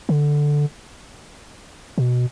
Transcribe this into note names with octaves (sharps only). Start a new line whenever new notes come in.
D3
B2